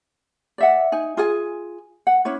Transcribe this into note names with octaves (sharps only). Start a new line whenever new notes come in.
D5 E5 F#5
D#4 G#5
F4 G#4 G#5
F#5
C#4 D4 E4 C#5